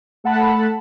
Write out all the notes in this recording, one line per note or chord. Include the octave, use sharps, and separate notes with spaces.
A3 A4 F#5 A5 B5